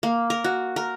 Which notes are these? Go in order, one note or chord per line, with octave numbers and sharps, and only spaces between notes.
A#3
A#4
F#4
A#4